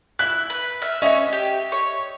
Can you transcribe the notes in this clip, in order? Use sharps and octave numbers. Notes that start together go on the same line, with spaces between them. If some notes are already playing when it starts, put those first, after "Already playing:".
E4 F#6
B4
E5 F6
C#4 C#5 D#5 E5
G4
C#5